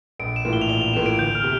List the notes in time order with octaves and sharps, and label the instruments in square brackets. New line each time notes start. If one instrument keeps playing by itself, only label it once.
[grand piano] A#1 [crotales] D7
[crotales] E7
[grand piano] A2 E3 A#3 F4
[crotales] G7
F7
[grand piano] A#1 [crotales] G7
[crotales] F7
[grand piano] A2 E3 A#3 F4 [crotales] E7
[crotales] D7
[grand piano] D2 [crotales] G6
[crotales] F6
[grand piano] C3